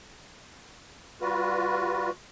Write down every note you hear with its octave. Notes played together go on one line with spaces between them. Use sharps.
G3 F4 F#4 B4